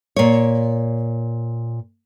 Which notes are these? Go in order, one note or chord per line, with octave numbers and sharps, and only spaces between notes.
A#2 C#5